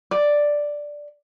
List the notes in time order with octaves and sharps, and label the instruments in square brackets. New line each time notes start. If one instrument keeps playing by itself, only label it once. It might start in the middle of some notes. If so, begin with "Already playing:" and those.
[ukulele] D5